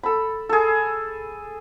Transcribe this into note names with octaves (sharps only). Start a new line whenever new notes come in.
A4 B5
G#4 A4